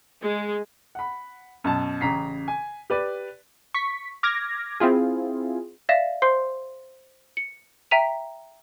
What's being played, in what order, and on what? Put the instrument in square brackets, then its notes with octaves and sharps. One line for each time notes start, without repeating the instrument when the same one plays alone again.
[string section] G#3
[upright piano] F#5 B5
F#2 B2 A5
A1 C#3 A#5 B6 C7
G#5
G4 B4 D5
[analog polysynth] C#6 B6
D6 F6 G#6 A#6
C4 E4 F4 G#4
[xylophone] D5 E5 F5 A#6 E7
C5 C6 C7
C#7
E5 G5 A#5 B6 D#7 F7